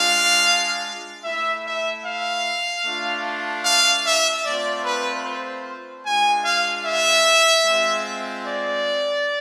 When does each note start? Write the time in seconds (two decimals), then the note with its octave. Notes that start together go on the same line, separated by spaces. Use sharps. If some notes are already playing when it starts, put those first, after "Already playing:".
Already playing: G#3 D4 F4 F5
1.24 A3 E4 E5
1.65 E5
2.05 F5
2.85 A3 D4 F4
3.65 F5
4.05 E5
4.45 A3 C4 F4 D5
4.85 B4
5.25 C5
6.05 G#3 D4 F4 G#5
6.45 F5
6.86 E5
7.66 G#3 C4 F4
8.45 D5